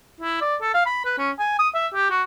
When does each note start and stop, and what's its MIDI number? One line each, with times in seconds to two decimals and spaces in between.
0.21 0.39 64
0.41 0.55 74
0.61 0.74 69
0.74 0.81 77
0.86 1.01 83
1.05 1.15 71
1.18 1.31 61
1.39 1.55 80
1.59 1.69 87
1.74 1.88 76
1.94 2.09 67
2.10 2.22 66